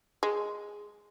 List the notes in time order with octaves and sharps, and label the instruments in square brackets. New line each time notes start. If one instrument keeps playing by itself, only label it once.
[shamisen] G#3